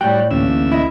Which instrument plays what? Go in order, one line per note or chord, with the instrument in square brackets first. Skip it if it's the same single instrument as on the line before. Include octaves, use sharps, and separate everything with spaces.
[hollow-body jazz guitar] A2 G5 [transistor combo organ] G3 F#4 [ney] D5
[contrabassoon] A1 [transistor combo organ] D2 E5 [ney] A#3
[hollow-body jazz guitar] E4 D#5